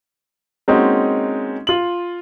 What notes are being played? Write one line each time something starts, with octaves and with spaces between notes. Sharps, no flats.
G#3 A#3 C4 C#4 D#4 F#4
F4 F#7